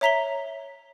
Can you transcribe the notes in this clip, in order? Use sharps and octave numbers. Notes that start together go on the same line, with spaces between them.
C#5 E5 A#5 B6 F7 G7